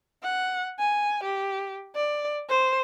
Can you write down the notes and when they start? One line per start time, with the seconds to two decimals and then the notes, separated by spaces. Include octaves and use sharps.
0.23 F#5
0.79 G#5
1.23 G4
1.95 D5
2.49 C5